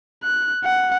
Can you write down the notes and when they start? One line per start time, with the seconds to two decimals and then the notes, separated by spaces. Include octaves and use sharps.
0.24 F#6
0.64 F#5